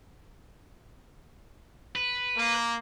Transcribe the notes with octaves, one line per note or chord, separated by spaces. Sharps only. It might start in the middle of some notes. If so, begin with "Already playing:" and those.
B4
A#3